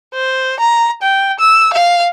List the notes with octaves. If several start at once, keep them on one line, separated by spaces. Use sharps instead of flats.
C5
A#5
G5
E6
F5